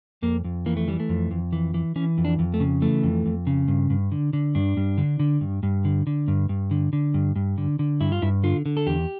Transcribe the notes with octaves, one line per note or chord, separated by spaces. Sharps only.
F2 A#3
F2
E3 A#3
A3
E3 G3
A3
F2
F2
E3
E3
E3 C#4
F2
D4
F2
A3
C#3
E3 A3
F2
F2
C#3
G2
G2
D3
D3
G2 D4
G2
D3
D3
G2
G2
D3
D3
G2
G2
D3
D3
G2
G2
D3
D3
G2 E4
F4
G2 E4
D3 F4
D3
A4
E2 G4